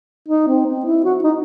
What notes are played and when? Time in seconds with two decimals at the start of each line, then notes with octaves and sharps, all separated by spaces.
0.28 D#4
0.47 C4
0.66 C4
0.86 E4
1.05 F#4
1.24 D#4